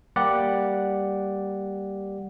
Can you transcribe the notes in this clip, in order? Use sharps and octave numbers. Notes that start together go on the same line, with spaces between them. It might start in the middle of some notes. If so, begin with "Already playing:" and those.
G3 A#3 G4 D5 F#5